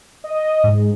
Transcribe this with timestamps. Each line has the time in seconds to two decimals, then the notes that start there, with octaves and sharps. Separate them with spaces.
0.24 D#5
0.63 G#2